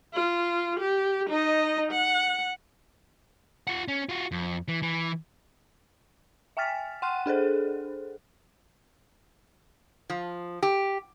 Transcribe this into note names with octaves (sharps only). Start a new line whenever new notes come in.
F4
G4
D#4 D#5
F#5
F4 F#5
C#4
F4 F#4
F2
E3
E3
E5 G5 G#5 F6 A6 B6
F#5 G5 C6 F6 F#6 D#7
D4 G#4 A4 C5
F3
G4